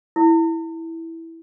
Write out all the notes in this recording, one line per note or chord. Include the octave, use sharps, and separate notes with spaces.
E4